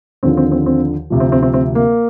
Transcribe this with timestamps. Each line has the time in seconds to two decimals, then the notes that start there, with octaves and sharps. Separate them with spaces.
0.23 D#2 D3 F3 C4
0.37 C4
0.52 C4
0.66 C4
1.10 D2 C3 F3
1.20 C4
1.32 C4
1.43 C4
1.54 C4
1.75 A#3